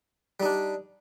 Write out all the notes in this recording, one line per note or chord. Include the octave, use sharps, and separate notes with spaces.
G3 D4 D#4